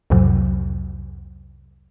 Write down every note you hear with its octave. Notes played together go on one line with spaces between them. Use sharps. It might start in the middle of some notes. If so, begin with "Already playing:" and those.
C2 F2 A2 C3 F#3